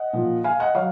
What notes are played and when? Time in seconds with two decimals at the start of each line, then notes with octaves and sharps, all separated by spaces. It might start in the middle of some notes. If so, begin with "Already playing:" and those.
Already playing: D#5 F#5
0.13 A#2 F3
0.44 F5 G#5
0.60 D#5 F#5
0.75 F#3 C#5 F5